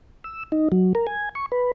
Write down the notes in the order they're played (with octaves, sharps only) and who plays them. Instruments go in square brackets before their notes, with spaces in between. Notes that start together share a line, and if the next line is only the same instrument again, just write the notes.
[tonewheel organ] E6
D#4
F#3
A#4
G#5
C#6
B4